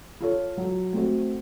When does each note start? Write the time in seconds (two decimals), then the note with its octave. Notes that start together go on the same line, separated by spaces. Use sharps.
0.21 F4 A4 C#5
0.57 F#3
0.93 A3 C4 F#4 C5